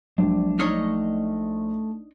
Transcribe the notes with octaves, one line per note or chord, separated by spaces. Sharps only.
A#1 F#3 G#3 D4
A3 D4 D#4 C#5 D#5 F6